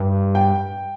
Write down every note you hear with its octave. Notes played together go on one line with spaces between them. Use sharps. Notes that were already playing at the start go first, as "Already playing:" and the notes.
Already playing: G2
G5